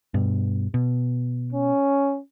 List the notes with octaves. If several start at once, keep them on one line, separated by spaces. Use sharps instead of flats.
G2 B2
B2
C#4